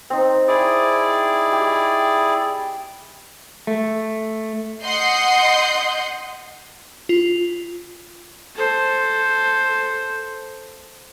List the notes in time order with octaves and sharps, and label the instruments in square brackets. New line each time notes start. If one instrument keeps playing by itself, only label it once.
[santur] C4 D#4
[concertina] E4 G#4 D5
[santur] G4
[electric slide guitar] A3
[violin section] D#5 F#5 C6 G6 C7
[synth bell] F4
[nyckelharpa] A4 C5